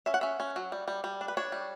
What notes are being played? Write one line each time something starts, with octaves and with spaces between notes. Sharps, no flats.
C#4 E5
F#5
C#4 E5
C#4
F#3
G3
G3
G3
D4
B4
D4 C#5
G3